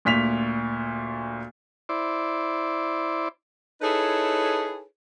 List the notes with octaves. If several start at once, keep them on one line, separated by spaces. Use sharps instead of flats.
D2 A#2 B6 F7
E4 C5 D5
D#4 E4 G#4 A4 B4 C#5